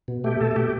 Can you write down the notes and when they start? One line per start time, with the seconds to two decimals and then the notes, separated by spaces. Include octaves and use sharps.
0.08 B2
0.24 A3 G4
0.40 B2 A4
0.51 A4
0.56 B2 G4